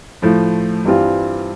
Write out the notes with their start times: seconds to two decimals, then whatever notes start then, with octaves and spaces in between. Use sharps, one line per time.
0.22 A2 F3 A3
0.85 G2 E3 G3 C4 F4